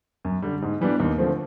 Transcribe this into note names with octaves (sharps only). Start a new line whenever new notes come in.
F#2
D3 G3
G#2
E3 G3 B3 D4
D#2
D3 F3 A3 C4